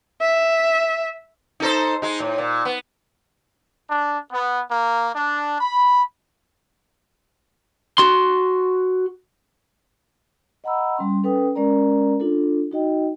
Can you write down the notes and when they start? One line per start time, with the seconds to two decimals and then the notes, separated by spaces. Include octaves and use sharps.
0.21 E5
1.60 D#4 A4 C5
2.02 G#3 D#4
2.20 A2
2.38 A#2
2.65 B3
3.89 D4
4.31 B3
4.70 A#3
5.15 D4
5.60 B5
7.98 F#4 C6
10.64 D#5 F#5 A#5 B5 E6
10.97 G3 C#4 C6
11.24 C#4 A4 B4 G5 D#6
11.55 G#3 C#4 A#4 D5 A#5
12.20 D4 F4 A4
12.71 D#4 F#4 D#5 G5